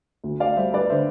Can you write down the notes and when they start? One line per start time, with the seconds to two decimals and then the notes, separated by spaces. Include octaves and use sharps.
0.24 D2
0.40 D5 F5
0.56 G3 C5 E5
0.73 B4 D5
0.90 D3 C5 E5